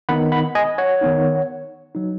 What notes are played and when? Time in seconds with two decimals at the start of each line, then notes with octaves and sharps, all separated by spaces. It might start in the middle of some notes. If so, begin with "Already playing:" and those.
0.09 D#3 B3 D#4 F#5 B5
0.32 F#5 B5
0.55 D#5 G#5
0.78 C#5 F#5
1.01 D#3 B3 D#4
1.95 F#3 D#4